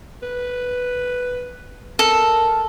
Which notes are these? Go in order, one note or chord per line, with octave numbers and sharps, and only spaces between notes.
B4
A4 A#4